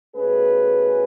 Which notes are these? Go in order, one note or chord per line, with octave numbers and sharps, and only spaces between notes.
B2 A3 C#4 G#4 B4